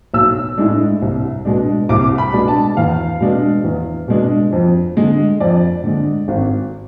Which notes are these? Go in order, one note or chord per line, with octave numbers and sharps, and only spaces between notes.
B1 E6
A2 G#3 D4
C2
B2 G#3 D4
C2 D6
B5
B2 G#3 D4
A5
E2 F5
B2 G#3 D4
E2
B2 G#3 D4
F2
D3 G#3
F2 D5
D3 G#3
G#1